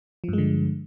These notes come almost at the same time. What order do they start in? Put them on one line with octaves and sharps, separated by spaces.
F3 G2 G#3 D3